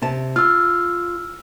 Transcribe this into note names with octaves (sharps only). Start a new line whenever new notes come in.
C3 G4 A5
F4 E6 F6